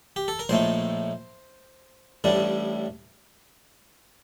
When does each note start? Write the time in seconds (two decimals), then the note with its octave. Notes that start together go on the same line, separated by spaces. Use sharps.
0.16 G4
0.28 A4
0.39 A#4
0.49 A#1 A2 A3 D#4 C5
2.24 A1 A2 G3 D4